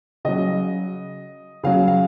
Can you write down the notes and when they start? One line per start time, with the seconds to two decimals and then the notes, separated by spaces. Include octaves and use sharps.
0.25 C#3 F#3 D#5
1.63 C#3 F#3 F5
1.88 F5